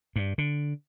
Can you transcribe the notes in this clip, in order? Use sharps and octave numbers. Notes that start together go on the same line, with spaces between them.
G2
D3